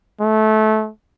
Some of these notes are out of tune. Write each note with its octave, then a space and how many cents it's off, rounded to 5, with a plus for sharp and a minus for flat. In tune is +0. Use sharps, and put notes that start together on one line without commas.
A3 -20